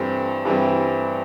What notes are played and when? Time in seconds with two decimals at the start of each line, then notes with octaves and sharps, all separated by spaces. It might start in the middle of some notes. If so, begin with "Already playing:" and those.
Already playing: G2 E3 G3 C4 A4
0.45 G2 E3 G3 C4